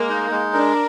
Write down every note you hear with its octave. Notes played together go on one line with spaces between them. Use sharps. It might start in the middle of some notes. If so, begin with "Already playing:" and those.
Already playing: G#3 A#3
D#4
G#3
D4 A#4